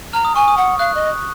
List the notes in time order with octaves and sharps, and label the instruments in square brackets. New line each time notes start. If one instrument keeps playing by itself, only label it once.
[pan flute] A#5 [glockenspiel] F6
[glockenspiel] D#6
[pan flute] G#5 [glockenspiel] C#6
[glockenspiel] D#6
[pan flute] F#5
[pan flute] F5 [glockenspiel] F#6
[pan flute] D#5